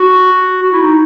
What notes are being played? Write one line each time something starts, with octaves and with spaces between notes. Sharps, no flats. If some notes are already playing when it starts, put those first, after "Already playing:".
Already playing: F#4
F#4
E4
D#4